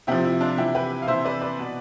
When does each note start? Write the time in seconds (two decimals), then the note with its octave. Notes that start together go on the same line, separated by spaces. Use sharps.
0.07 C3 F3 E4 G4
0.24 E4
0.41 D4 F4
0.58 C3 E3 E4 G4
0.75 G4 B4
1.02 F5
1.08 C3 E3 C5 E5
1.25 B4 D5
1.41 B4 D5
1.59 B2